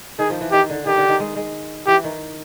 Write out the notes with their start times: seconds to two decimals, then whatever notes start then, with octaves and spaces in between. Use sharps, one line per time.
0.19 D#3 G#4
0.30 F3
0.41 E3
0.52 D#3 G4
0.70 D3
0.86 D#3 G4
0.98 D3
1.09 D#3
1.20 G#3
1.36 G#3
1.87 E3 G4
2.04 D#3